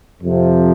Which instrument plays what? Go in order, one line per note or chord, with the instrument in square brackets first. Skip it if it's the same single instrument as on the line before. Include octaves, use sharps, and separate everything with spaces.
[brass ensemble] F2 C3 F3